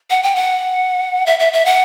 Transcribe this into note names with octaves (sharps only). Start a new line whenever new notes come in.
F#5
G5
F#5
E5
E5
E5
F#5